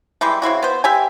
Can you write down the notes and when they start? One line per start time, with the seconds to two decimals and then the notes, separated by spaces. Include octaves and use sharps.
0.21 E3 G3 G#3 G4
0.42 C#3 C4 E4 F#4
0.62 B3 C5
0.84 G4 E5 G5 G#5